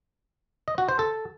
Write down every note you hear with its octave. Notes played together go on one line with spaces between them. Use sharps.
D#5
F#4
C5
A4